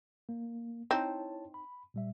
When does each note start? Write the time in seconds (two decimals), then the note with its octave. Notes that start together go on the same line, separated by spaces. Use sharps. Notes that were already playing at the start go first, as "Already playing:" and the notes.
0.29 A#3
0.91 C4 D#4 E4 C#5 A5
1.54 B5
1.94 A#2 G3 E5